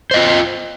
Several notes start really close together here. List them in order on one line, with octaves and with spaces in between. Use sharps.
C5 D#5 F4